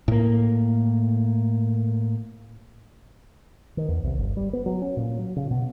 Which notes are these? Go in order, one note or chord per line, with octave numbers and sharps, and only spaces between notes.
A2 A#3
D#3
E2
C2
G1
G3
B3
F#3
C#4
A#2
F#3
C#3
B2